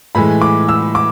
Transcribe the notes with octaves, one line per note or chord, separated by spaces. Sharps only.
A2 E3 G#3 B5
D6
E6
D6